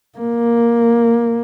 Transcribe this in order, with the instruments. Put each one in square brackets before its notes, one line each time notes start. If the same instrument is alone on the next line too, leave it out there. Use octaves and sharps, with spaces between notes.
[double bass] A#3